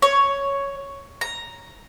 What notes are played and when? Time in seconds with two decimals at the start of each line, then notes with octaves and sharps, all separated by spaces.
0.02 C#5
1.21 A#5